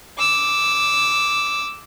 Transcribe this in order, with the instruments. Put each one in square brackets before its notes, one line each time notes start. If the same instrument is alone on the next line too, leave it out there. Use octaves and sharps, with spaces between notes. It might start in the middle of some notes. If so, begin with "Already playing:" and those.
[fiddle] D6 E6